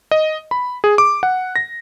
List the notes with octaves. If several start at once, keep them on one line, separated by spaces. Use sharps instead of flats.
D#5
B5
G#4
D6
F#5
A#6